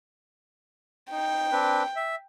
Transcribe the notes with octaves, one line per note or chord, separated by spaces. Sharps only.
D#4 G5
C4 D4 B4
E5